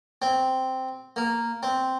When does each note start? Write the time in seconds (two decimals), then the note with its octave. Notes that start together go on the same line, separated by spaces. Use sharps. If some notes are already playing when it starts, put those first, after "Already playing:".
0.22 C4
1.16 A#3
1.63 C4